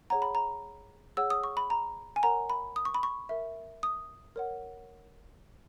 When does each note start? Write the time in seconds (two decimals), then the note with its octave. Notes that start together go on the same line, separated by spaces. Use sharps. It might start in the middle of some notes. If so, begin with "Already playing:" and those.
0.10 G#4 C#5 F#5 A#5
0.22 B5
0.35 A#5
1.17 G#4 C#5 F#5 E6
1.30 D#6
1.44 C#6
1.57 B5
1.70 A#5
2.16 G#5
2.23 A#4 C#5 F#5 A#5
2.50 B5
2.76 D#6
2.85 C#6
2.94 B5
3.03 C#6
3.29 A#4 E5
3.83 D#6
4.36 A#4 C#5 F#5